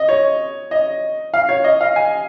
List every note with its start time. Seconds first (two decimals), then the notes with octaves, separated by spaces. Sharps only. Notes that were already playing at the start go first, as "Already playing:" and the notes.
Already playing: D#5
0.09 C#5
0.71 D#5
1.34 F5
1.49 C#5
1.64 D#5
1.81 F5
1.96 G#5